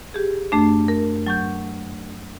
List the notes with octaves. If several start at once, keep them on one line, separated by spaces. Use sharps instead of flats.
G4 G#4
F#2 A3 D4
A#4
F#3 C#6 G6